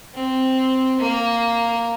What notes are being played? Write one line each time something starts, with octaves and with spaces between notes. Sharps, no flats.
C4
A#3